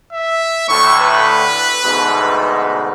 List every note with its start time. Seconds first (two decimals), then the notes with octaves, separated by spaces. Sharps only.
0.12 E5
0.68 D2 A2 C#6
1.00 B4
1.84 D2 G#2 B2